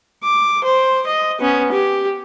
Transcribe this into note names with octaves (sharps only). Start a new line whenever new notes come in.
D6
C5
D#5
B3 C#4
G4